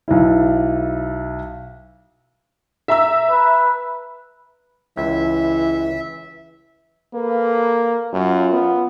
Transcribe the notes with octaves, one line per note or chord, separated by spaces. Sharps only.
B1 E4
E5 A#5 E6
B4
C#2 E3 E5
A#3 A4 B4
F#2 F4
B3